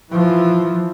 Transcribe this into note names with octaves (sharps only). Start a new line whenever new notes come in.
E3 F3